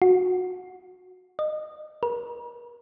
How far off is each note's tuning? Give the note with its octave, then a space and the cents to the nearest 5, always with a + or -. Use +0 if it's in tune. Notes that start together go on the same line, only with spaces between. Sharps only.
F#4 -15
D#5 -25
A#4 +45